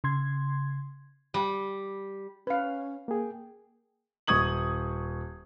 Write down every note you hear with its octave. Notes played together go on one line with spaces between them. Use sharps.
C#3 C6 G#6
G3
C#4 B4 F5
A#3 G#4 G5
D#1 C#6 D#6 G#6 F#7